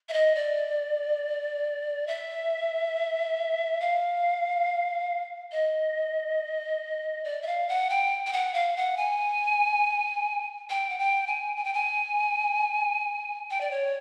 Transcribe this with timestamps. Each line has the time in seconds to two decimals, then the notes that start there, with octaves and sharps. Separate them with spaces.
0.09 E5
0.13 D#5
0.35 D5
2.08 E5
3.80 F5
5.52 D#5
7.24 D5
7.42 E5
7.47 F5
7.69 F#5
7.90 G5
8.27 G5
8.33 F#5
8.54 F5
8.76 F#5
8.97 G#5
10.70 G5
10.90 F#5
10.99 G5
11.27 G#5
11.56 G#5
11.64 G5
11.74 G#5
13.50 G5
13.61 D5
13.71 C#5